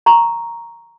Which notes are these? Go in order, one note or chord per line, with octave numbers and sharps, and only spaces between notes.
A#5 C#6